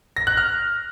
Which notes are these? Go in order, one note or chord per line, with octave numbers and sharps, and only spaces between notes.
A#6
F#6
F6